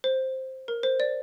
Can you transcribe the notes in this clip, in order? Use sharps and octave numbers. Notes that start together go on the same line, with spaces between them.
C5
A#4
C5
D5